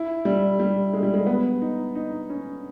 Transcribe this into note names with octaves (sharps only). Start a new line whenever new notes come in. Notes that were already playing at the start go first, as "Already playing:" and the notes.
Already playing: E4
G3
G3
G#3
G3
G#3
B3
D#4
D#4
C#4